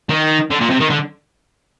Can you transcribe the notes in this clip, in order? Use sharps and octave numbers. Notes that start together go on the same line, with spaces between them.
D#3
D3
A#2
C3
D#3
D3